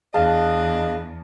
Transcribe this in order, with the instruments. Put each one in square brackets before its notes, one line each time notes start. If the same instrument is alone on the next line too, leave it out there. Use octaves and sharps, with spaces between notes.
[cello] E2 [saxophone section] D4 B4 D#5 [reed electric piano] G#4 F5 [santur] A5